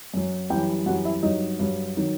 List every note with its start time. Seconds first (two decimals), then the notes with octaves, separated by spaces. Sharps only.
0.14 F#2 F#3
0.50 F#2 E3 G3 G4 G5
0.86 F#2 E3 G3 F#4 F#5
1.05 E4 E5
1.23 G2 F#3 D#4 D#5
1.59 G2 F#3
1.97 D#3 F#3